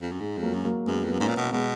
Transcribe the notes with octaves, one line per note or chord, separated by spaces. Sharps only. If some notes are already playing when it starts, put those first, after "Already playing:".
F2
F#2
G#2 G#3
F2
F#3 A#3
F#2
F#3 A#3
F#2 G#3 B3
F2
F#2 B3
G#2 A#3 C#4
A#2
B2
B2 G#3 B3